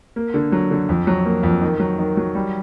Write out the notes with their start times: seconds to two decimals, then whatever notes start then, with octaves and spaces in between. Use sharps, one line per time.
0.16 A#3
0.34 D3
0.52 F#3
0.71 D3
0.89 F2
1.07 F#3
1.25 A#3
1.43 F2
1.61 D#3
1.80 F#3
1.99 D#3
2.17 F#3
2.35 G3